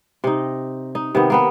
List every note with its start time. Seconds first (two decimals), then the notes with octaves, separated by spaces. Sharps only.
0.24 C3 D#4
0.95 D#4
1.15 C3 D#3 B3
1.30 A#3 B3 B4